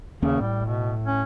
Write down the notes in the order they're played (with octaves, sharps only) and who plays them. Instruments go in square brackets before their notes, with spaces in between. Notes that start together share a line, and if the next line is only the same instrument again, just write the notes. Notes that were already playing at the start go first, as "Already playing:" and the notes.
[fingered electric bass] D#2 A#3 C#4 [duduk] C#3
[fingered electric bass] A2 [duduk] G3
[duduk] B2
C#4